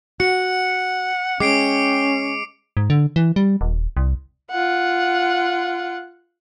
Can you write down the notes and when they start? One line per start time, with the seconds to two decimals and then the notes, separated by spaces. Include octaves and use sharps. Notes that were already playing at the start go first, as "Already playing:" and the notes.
0.20 F#4 F#5 C#7
1.40 G#3 C#4 G5 D6 C7 D7
2.77 G#2
2.90 D3
3.16 E3
3.36 G3
3.61 D#1
3.97 C2
4.51 F4 F#5